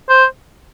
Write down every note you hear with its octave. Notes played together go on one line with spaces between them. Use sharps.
C5